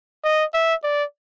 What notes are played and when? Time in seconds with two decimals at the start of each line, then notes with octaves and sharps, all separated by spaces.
0.24 D#5
0.54 E5
0.83 D5